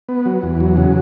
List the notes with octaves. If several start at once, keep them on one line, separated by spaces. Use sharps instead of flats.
B3
F#3
E2
F#3
C#3